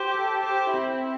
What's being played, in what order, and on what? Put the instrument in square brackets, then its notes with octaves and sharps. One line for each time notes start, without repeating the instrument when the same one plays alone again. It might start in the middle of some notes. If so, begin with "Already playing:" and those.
Already playing: [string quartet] G4 [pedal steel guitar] C5
[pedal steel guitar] A4
[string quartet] G4 [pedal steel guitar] C5
[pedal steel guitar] C4 [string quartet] E4